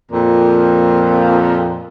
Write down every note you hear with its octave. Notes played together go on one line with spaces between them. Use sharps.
F2 A#2